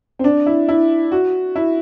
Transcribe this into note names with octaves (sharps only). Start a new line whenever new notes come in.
C4
D4
E4
E4
F#4
E4